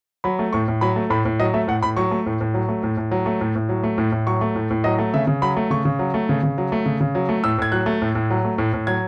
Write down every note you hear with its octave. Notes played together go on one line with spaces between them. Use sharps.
F#3 B5
A3
A2 C#6
A2
F#3 B5
A3
A2 B5
A2
F#3 D#5
A3 E5
A2 F#5
A2 B5
F#3 C#6
A3
A2
A2
F#3
A3
A2
A2
F#3
A3
A2
A2
F#3
A3
A2
A2
F#3 C#6
A3
A2
A2
F#3 D#5
A3
C#3 E5
C#3
F#3 B5
A3
C#3 C#6
C#3
F#3
A3
C#3
C#3
F#3
A3
C#3
C#3
F#3
A3
A2 E6
A2 G#6
F#3 F#6
A3
A2
A2
F#3
A3
A2
A2
F#3 G#6